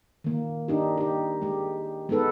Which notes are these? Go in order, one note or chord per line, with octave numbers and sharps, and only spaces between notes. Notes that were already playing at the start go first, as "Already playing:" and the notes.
D#3 A#3
D4 D#4 G4
D#4 G4
G#3 G4
G#3 B3 D#4 A4 B4